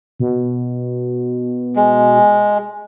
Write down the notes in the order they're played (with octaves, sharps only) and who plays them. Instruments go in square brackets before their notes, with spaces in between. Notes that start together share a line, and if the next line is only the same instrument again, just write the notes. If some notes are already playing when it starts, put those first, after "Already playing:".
[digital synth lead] B2
[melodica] G#3